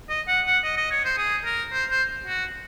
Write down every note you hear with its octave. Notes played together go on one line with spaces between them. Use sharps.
D#5
F#5
F#5
D#5
D#5
C#5
C5
G#4
A#4
C5
C5
F#4